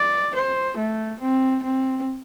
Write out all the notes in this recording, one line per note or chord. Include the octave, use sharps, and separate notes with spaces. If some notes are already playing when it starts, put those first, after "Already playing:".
Already playing: D5
C5
A3
C4
C4